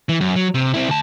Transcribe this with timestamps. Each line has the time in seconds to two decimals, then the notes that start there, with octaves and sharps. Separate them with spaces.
0.09 E3
0.21 F#2
0.36 F#3
0.54 C3
0.74 C4 E4
0.89 D2 A5